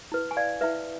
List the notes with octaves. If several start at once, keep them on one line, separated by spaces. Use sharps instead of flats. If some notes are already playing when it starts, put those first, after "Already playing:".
E4 B4
G#5
D5 F5
E4 B4 E5